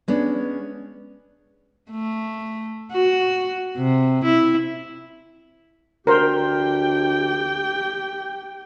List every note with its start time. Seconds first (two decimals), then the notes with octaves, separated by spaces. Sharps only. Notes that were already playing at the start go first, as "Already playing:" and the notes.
0.08 G#3 B3 C#4 D4
1.91 A3
2.92 F#4
3.77 C3
4.24 E4
6.07 D2 G4 A#4 C5 G5